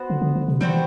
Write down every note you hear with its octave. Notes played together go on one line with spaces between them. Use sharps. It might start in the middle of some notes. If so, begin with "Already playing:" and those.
Already playing: B3 F#4 C5
D3
D3
D3
C3
E3 G3 C4 F#4 C5